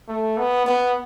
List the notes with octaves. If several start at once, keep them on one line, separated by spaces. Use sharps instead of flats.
A3
B3
B3